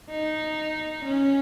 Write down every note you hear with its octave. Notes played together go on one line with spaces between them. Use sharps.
D#4
C#4